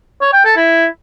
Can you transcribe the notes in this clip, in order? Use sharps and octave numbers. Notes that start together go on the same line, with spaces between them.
C#5
G5
A4
E4